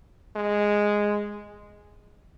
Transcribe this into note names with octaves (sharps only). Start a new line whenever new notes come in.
G#3